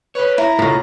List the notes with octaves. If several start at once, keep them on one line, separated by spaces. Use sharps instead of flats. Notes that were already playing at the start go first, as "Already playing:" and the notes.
G#4 B4 C#5
E4 A#5
C#2 A2 F4